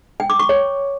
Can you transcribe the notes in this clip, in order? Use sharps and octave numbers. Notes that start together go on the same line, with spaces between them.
G5
D6
C#6
C#5